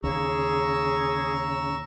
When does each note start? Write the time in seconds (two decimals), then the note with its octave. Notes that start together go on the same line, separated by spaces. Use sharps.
0.04 D#2 C#3 G#4 A#5 C#6 E6